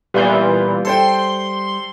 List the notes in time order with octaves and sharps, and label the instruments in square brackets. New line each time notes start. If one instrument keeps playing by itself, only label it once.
[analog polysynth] A#2 E3 F4 [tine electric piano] G3 G6 [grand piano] B3
[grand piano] A4 C5 G5 [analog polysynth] C6